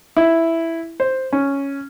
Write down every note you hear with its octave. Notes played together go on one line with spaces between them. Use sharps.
E4
C5
C#4